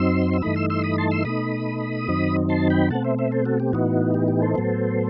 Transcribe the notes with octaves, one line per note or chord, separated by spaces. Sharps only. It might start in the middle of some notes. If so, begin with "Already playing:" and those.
Already playing: F#2 F#3 C4 D#4 C6 E6
E6
G2 E3 A3 D#4 B5 D#6
C6 E6
C6 E6
B5 D#6
A5 C6
C6 E6
B2 A3 D#4 B5 D#6
F#2 D#3 F#3 C4 D#4
A5 C6
G5 B5
B2 A3 C4 F#5 A5
C5 E5
C5 E5
A4 C5
F#4 A4
G4
A2 E3 B3 D#4 F#4
G4
G4
A4 C5
A2 F#3 B3